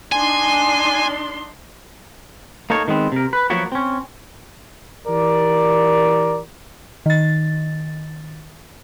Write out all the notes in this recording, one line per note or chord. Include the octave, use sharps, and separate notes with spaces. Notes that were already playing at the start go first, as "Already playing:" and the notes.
D4 D#4 G#5 C6
A#3 D#4 A4 A#4 C#5
D#3 G#3 B3 C4
C3 A#4
B4
F3 F#3 A#3 B3 E4 F#4
C4 C#4
E3 G4 A#4 D5
D#3 A6